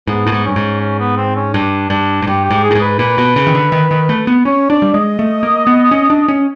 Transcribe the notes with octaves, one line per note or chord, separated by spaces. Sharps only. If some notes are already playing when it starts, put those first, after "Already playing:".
G#2 B3
A2
G#2
G2 C#4
G#2
C#4
B3
C4
C#4
G2 D4
G2 D4
G#2
G2 G4
G4
G#2
G#4
A2
G#2
B4
A#2 B4
B2
C#3
D#3
D3
D#3
D#3
A3
B3
C#4 C#5
D4 D5
G3
G#3 D#5
A3
A#3
B3
C#4
D4
C#4